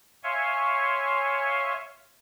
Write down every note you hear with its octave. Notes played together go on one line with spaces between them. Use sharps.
C#5 E5 F5 G#5 C6 C#6